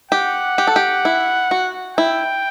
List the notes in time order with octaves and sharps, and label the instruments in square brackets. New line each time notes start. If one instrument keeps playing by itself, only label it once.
[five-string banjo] G4 [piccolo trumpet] F#5
[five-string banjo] G4
A4
G4
E4
F#4
[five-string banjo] E4 [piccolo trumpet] G5